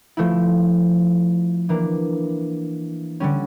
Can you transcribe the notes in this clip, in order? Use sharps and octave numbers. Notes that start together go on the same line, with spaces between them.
F3 A3 E4
E3 A#3 D4
D3 G3 C#4